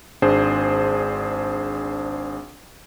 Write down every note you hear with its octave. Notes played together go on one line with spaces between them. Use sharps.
G#1 D4 G#4 C5